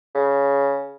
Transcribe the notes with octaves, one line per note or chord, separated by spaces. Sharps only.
C#3